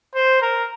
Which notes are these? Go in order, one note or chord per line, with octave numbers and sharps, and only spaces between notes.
C5
A#4